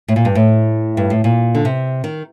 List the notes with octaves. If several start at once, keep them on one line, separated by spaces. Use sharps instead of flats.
A2
A#2
G2
A2
G2
A2
A#2
D3
C3
D#3